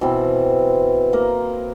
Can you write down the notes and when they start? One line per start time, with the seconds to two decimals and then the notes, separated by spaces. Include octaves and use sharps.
0.01 B2 E3 C4
1.13 A#3 A#4